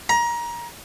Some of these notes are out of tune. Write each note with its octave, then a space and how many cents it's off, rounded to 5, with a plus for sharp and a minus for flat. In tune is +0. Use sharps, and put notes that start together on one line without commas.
A#5 +25